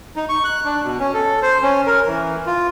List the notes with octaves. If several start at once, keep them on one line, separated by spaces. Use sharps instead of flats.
D#4
C#6
F#6
D4
B2
C#4
A4
C5
C#4
A#4
E3
F4